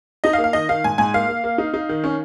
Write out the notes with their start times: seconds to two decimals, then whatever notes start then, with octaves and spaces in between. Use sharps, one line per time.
0.24 D#4 D#5
0.33 F5
0.38 A#3
0.44 F5
0.53 D#3 D#5
0.69 D#3 F5
0.84 G#2 G#5
0.98 G#2 G#5
1.14 A#3 F5
1.28 A#3
1.44 A#3
1.58 D#4
1.74 D#4
1.89 D#3
2.04 C#4